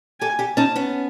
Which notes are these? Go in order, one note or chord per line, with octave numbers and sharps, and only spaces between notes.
G4 A4 G#5
G4 A4
C#4 D#4 A5
B3 C#4